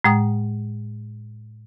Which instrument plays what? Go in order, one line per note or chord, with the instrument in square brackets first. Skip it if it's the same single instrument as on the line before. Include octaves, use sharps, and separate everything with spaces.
[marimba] A2 G#3 G5 D#6